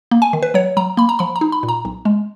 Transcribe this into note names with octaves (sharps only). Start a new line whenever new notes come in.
A#3
G#5
D#3
B4
F#3 C#5
F#3 A#5
A#3 B5
A#5
F3 B5
A#5
D#4
B5
A#2
A#5
B1
G#3